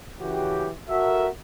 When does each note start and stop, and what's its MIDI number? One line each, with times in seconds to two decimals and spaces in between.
0.19 0.70 49
0.19 0.70 52
0.19 0.70 61
0.19 0.70 66
0.19 0.70 67
0.89 1.27 66
0.89 1.27 69
0.89 1.27 70
0.89 1.27 76